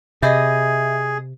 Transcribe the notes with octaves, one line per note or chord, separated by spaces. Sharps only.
C3 G#4 D#5 E5 B5 D6 G6